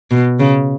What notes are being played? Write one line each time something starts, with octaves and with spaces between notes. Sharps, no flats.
B2
C#3